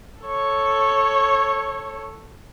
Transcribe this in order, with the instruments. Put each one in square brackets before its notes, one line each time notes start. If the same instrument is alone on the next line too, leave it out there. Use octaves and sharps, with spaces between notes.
[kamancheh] A4 C#5